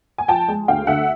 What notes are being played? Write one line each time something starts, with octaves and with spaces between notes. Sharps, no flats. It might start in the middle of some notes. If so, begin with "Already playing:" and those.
G#5
F3 G5 A5
G#3
D2 F5 G5
D3 E5 F#5